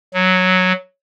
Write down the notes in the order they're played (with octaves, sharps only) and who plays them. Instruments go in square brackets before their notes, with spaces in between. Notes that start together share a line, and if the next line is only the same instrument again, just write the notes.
[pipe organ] F#3